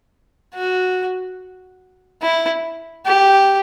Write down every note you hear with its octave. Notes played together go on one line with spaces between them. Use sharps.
F#4
E4
G4